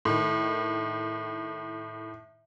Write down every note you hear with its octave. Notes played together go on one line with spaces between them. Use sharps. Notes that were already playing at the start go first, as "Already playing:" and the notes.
A2 D#3